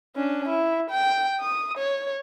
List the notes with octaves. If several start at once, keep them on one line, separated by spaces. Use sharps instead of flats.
C#4 D4
E4
G5
D#6
C#5